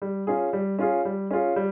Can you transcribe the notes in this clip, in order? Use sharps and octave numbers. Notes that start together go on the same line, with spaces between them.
G3
C#4 F4 G#4
G3
C#4 F4 G#4
G3
C#4 F4 G#4
G3